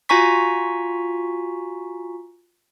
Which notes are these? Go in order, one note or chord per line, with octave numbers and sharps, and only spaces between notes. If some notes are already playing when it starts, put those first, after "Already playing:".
F4 F#4 G#5 A#5 C#6 B6